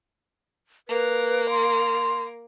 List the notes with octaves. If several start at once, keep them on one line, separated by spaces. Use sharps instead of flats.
A#3 B4
C6